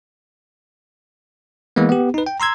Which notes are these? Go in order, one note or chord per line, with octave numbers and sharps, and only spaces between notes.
E3 G#3 A#3 B3
B3 G4
D#4 B4
G5
A#5 C6 E6 G#6